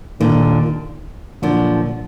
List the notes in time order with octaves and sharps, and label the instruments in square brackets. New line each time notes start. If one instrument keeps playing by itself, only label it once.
[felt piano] D#2 D#3 A#3 F4 [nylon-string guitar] A#2 D3
[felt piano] A#2 F#3 D4 [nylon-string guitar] D3 F3